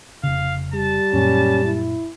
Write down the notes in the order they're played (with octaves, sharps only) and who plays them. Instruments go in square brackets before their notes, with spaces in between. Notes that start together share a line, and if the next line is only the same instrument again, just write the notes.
[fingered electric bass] F1 C#3 [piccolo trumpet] F5
[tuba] G3 [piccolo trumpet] A5
[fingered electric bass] F#2 A#2 [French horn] C#4
[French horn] E4